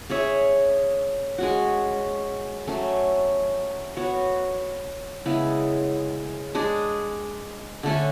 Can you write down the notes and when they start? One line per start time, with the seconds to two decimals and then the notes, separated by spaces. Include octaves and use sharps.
0.10 C#4 G#4 C#5 E5
1.38 G#3 C#4 F#4
2.67 F#3 A3 C#4
3.96 B3 F#4 C#5
5.25 C#3 G#3 B3 E4
6.55 G#3 D4 G#4
7.83 D3 A3 C#4